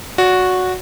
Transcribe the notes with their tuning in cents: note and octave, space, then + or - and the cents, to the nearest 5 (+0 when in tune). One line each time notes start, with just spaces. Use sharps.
F#4 -10 D5 -40